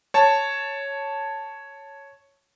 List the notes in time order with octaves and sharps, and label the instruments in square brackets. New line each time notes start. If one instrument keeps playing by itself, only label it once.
[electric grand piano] C#5 A5